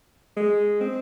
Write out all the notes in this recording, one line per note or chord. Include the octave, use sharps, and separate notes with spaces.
G#3
C4